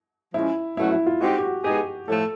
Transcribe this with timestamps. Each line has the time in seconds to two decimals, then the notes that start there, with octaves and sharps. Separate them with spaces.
0.34 F3 G#3 C#4 E4
0.77 B2 F#3 A3 C#4 E4 F#4
0.92 E4
1.06 F4
1.21 G#3 C4 D#4 F#4 G4
1.39 G4
1.43 F#4
1.64 G#3 B3 D#4 G4 G#4
2.08 A2 F3 A3 A4